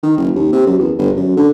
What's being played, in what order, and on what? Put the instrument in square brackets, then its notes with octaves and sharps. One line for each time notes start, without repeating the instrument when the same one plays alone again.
[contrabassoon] D#3
F#1
D#2
C3
F#2
E2
G1
F#2
D3